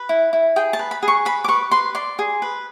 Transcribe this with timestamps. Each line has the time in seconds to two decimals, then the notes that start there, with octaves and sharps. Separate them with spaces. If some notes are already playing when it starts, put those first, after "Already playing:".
Already playing: B4
0.09 E4
0.33 E4
0.56 G#4 G5
0.73 A5
0.79 B4
0.91 B5
1.03 G#4
1.08 C#6
1.25 B4 B5
1.44 D6
1.48 B4 C#6
1.71 B4 C6
1.95 D5 C6
2.19 G#4
2.42 B4